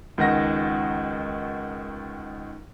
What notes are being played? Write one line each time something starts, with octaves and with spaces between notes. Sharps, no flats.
C#2 D#3 D#4 F#5 A#6